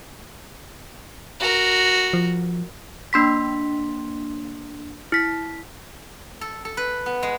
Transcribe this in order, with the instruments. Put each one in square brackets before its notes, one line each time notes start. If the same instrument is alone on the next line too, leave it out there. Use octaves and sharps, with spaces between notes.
[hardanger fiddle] F#4 A#4
[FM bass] F3
[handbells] A#3 D4 C6 B6
E4 B6
[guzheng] A4
A4
B4
B3
G#3